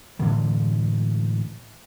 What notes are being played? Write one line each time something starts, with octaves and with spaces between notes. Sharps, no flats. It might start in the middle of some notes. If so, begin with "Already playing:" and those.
A2 D3 E3 G#3